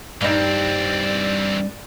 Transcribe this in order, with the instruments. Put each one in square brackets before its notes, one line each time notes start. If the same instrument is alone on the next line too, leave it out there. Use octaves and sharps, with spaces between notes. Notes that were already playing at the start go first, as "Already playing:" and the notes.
[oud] G2 D#4 [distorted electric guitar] E3 C4 [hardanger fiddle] D5